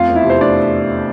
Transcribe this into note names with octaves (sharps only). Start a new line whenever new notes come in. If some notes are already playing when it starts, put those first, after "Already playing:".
Already playing: F2 A3 F4 F5
E2
E4 E5
C3
C5
A3 D4 D5